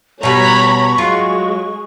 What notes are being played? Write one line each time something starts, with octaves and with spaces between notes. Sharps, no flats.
B2 G3 C#5 A#5 B5 C#6
F#3 G#3 F4